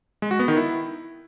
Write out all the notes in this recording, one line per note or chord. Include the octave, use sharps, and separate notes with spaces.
G#3
F#4
B3
D#3
E4